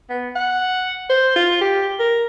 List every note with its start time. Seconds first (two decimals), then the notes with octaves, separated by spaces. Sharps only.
0.10 B3
0.36 F#5
1.09 C5
1.36 F4
1.61 G4
2.00 A#4